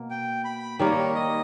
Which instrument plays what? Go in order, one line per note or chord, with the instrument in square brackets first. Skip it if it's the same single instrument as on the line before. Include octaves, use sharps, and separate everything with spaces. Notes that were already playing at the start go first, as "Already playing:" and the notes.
Already playing: [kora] B2 A#3
[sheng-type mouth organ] G5
B5
[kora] D#3 G3 A#3 D#4 [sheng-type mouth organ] C#5
[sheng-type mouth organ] D#5